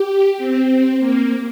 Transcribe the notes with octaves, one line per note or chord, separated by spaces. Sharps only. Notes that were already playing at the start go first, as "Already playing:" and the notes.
Already playing: G4
C4
A#3